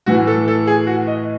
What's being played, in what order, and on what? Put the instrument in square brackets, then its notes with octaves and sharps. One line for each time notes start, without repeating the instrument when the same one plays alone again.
[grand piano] A2 E3 F#4
A4
A4
G#4
F#4
D#5